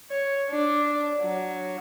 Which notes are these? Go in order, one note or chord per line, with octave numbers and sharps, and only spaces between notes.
C#5
D4
F#3